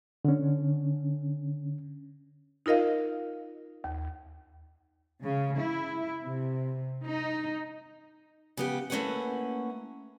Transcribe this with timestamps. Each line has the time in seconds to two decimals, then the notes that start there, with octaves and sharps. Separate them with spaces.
0.25 D3 C#4
2.66 D#4 F4 A#4 D#5 F5
3.84 D#2
5.23 C#3
5.59 E4
6.23 C3
7.04 D#4
8.57 C#3 B3 G4
8.90 A3 A#3 C#4 E4 B4 F#5